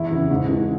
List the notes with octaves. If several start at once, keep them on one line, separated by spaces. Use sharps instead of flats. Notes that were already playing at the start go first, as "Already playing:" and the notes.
Already playing: E2 E4
C#3 E3
G#2
E3